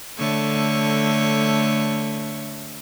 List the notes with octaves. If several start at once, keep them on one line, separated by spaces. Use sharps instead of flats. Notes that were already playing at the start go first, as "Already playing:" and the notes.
D3 A3 C#5